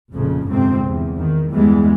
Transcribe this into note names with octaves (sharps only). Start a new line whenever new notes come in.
F1 F2 A#2 C#3
G1 F2 G#2 C3 C4
E2
D#3
E2 G2 E3 G3 G#3 B3